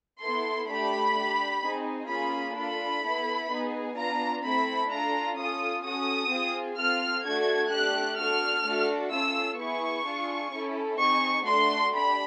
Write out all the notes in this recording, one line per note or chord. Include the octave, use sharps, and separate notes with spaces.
B3 E4 A4 C6
A3 D4 G4 B5
D4
G4
C4 D#4 G#4
A#3 C#4 F4 G#4 B5
D4 F4 A4 B5
B3 E4 A4
B3 D#4 G#4
B3 D4 F4 A#5
A3 C4 E4 A4 B5
D4 F4 A4 A#5
C#4 F4 A4 D#6
C#4 F#4 A4 D#6
C4 F4 G#4
C4 F4 A4 F6
A3 D4 F#4 A4 G#6
A3 D4 G4 F#6
D4 F#4 A4 F6
A3 D4 F#4 A4
C#4 F4 A4 E6
B3 E4 G#4 C#6
D4 F4 G#4
C#4 E4 A4
C4 D#4 G#4 C#6
A3 D4 F#4 C6
D4 G4 B5